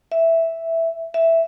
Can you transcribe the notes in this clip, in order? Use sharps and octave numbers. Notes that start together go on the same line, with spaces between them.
E5
E5